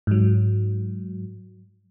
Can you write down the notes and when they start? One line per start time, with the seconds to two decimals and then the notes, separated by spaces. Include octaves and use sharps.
0.07 G#2 F#3